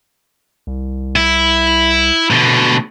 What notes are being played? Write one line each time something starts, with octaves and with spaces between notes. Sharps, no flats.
C2
E4
B2 D3